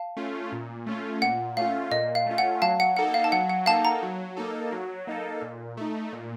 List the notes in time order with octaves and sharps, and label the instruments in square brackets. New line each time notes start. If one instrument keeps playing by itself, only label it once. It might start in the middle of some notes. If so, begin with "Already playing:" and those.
Already playing: [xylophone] F5 A5
[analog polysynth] A3 C#4 F4
A#2
A3 C#4 F4
[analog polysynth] A#2 [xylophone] F#5
[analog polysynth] A3 C#4 F4 [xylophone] F5
[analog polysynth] A#2 [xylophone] D#5
[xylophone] F5
[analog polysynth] A3 C#4 F4
[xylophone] F#5
[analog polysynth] F#3 [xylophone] F5 A5
[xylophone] F#5
[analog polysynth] A#3 D#4 A4 [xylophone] F#5
[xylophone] F5
A5
[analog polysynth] F#3 [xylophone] F#5
[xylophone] F#5
[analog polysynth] A#3 D#4 A4 [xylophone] F5 A5
[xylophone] F#5 A#5
[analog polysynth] F#3
A#3 D#4 A4
F#3
A#3 D#4 A4
A#2
A3 D#4
A#2